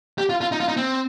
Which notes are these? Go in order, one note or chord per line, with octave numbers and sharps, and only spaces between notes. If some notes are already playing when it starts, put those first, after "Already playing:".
G4
F4
F4
D#4
F4
D#4
C4